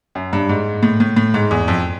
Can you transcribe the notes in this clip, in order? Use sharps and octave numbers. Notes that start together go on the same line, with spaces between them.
F#2
G2
G#2
A2
A2
A2
G#2
E2
F2